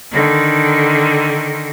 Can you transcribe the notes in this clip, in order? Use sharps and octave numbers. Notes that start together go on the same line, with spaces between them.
D3 D#3